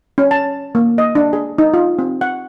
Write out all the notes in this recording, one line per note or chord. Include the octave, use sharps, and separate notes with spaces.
C#4
A5
A#3
D#5
D4
G#4
D#4
F4
C4
F#5